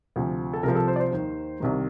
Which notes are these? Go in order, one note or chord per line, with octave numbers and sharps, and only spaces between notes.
D2 C3 F3
A4
C2 C3 F3 A#4
A4
C5
D5
C5
D#2 D#3
C2 C3 D#3